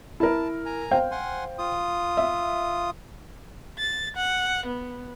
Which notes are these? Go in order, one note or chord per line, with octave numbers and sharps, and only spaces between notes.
E4 A#4 A5
G#5 A#5
C5 F5 G5
F#5 G#5 C6
F4 D#6
E5
A6
F#5
B3